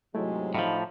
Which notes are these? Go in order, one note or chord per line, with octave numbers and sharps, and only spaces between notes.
G#2 C3 F#3 G#3 A3 E4
A2 F3 D#4 F5 B5